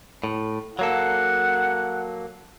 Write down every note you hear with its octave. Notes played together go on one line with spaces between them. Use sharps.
A2
F#3 A#3 A4 F#5